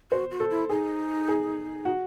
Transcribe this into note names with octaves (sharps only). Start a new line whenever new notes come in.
F#4 C5
F#4
A4
E4
D#4 G#4
G#4
F#4